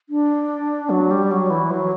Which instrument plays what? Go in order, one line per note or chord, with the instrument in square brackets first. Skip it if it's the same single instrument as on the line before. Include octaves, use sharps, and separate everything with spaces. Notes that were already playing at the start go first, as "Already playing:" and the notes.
[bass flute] D4
F#3
G3
F#3
E3
F#3